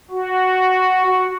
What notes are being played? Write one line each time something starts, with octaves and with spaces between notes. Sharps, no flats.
F#4